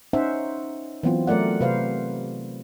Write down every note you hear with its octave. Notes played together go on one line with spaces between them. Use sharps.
C#4 D#4 C5 E5 F#5
E3 F#3 B3 C4 F4
F#3 A3 A#4 D5 F#5
C3 B4 C5 F5